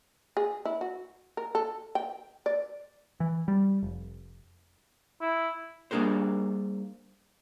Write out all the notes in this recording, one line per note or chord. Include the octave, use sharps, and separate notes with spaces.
G#4
E4
F#4
A#4
A4
G5
D5
E3
G3
F1
E4
G3 A#3 D4 G#4 A#4 C5